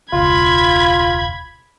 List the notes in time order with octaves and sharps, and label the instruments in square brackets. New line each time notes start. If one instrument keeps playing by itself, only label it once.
[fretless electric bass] E1 C#2 [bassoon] F4 [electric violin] B5 G#6